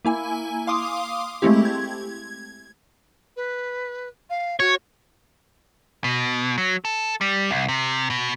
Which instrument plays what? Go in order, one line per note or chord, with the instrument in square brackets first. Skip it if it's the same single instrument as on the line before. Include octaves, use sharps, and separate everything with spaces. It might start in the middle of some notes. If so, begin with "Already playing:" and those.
[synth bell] A#3 E4 G#5
F5 C6 D6 D#6
G#3 A3 C4 E4 G4
G#6
[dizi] B4
F5
[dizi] F#4 [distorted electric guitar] C#5
[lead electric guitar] B2
F#3
A4
G3
C2
C3
B2